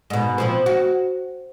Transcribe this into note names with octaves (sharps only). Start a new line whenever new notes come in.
G#2 B2
B2 F3 C4
F#4